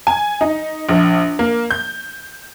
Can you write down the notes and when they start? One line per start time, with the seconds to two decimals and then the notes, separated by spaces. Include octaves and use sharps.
0.07 G#5
0.41 D#4
0.89 A#1
1.39 A#3
1.71 G6